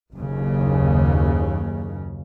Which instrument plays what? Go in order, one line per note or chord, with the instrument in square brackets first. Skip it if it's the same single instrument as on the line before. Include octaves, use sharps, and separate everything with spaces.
[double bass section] F#1 D#2 C#3